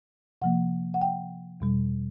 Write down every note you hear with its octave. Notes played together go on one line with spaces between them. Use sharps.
C3 F3 A#3 F#5
F#5
G5
E2 B2 G3